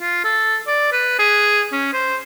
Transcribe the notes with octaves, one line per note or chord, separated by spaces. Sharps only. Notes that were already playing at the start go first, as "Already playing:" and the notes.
F4
A4
D5
B4
G#4
C#4
C5